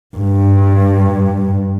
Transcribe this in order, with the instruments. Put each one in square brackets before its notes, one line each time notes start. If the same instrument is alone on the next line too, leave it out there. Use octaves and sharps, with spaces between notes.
[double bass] G2